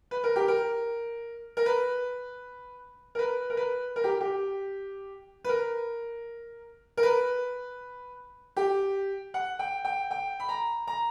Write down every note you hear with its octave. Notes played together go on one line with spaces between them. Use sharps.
B4
A#4
G4
A#4
A#4
B4
A#4
B4
A#4
B4
A#4
G4
G4
B4
A#4
A#4
B4
G4
F#5
G5
G5
G5
B5
A#5
A#5